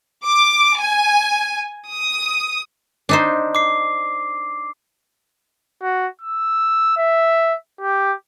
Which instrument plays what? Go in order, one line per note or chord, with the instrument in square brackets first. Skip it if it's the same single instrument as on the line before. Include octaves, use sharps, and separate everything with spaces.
[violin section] D6
G#5
D#6
[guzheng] D4 D#4 C5
[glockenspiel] D6 C7
[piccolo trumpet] F#4
E6
E5
G4